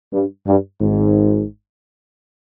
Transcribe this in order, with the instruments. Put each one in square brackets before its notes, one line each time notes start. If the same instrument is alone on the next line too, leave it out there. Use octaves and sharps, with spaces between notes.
[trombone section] G2
G2
G#1 G#2